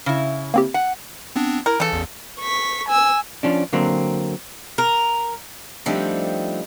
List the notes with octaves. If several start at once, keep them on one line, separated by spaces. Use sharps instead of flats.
C#3 E4
A#3 C4 G4
F#5
B3 C4 D4
E4 A#4
C#3 E3 A4
A1 E2
C#6 B6
G#5 E6
F3 C#4 D4
D3 F#3 A#3 C4
A#4
F3 G3 A3 C4 D4 D#4